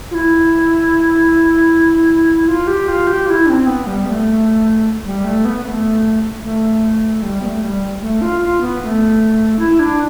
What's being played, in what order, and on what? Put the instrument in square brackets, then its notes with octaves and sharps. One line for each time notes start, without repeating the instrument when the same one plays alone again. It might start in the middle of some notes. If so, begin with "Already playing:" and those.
[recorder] F4
E4
F4
G4
F4
G4
F4
E4
D4
C4
B3
G3
B3
A3
G3
A3
B3
B3
A3
A3
G3
B3
A3
G3
A3
F4
F4
B3
B3
A3
E4
D4